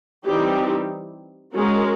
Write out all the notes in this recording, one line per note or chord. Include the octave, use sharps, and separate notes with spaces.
E3 G3 C4 D#4 G4
G#3 C#4 F#4 A#4